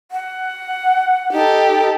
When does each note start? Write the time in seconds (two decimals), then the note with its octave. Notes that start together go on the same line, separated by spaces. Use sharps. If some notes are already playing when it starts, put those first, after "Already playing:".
0.12 F#5
1.33 D#4 G4 A4